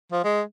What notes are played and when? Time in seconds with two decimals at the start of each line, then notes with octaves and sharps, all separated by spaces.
0.13 F3
0.25 G#3